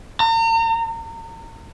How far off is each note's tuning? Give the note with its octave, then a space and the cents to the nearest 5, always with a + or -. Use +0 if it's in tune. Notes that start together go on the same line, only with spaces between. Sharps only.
A#5 -40